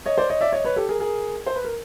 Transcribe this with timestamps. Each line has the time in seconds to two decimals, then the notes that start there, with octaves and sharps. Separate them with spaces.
0.06 C#5 D#5
0.18 C5 D5
0.29 C#5 D#5
0.41 D5 E5
0.52 C#5 D#5
0.64 B4 C#5
0.76 G4 A4
0.89 G#4 A#4
0.99 G#4 A#4
1.46 C5
1.56 B4
1.64 A#4